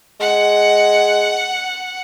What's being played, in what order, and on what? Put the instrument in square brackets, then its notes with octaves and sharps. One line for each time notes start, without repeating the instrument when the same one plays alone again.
[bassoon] G#3 [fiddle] F#5